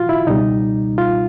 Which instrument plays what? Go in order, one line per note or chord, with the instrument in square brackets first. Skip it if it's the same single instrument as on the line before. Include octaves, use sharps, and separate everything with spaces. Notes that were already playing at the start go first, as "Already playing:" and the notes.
Already playing: [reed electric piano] A#2 F3 F4 F#4
E4
C#2 B2 G3 D#4
F4